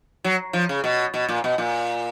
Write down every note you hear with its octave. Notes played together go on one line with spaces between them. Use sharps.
F#3
F3
C#3
B2
B2
A#2
B2
A#2